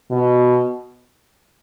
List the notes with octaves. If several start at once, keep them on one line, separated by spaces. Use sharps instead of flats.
B2